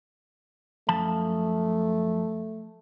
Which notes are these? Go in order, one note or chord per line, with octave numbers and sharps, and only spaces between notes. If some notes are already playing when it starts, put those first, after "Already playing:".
F#2 F3 A3 A5